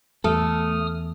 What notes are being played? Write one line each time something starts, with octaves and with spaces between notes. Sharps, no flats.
E2 A3 A4 D#6 F6